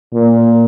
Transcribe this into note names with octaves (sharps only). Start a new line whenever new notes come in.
A#2